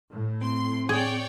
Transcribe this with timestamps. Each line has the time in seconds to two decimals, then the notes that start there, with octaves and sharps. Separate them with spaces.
0.12 A2
0.41 C4 C6
0.89 G#4 C#5 D5 G5